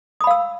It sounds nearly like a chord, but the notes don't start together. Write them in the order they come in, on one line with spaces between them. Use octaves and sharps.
D#6 B5 F5 E6